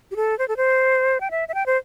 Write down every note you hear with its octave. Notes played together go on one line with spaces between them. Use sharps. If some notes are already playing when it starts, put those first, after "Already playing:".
G4
A4
C5
A4
C5
G5
E5
E5
G5
C5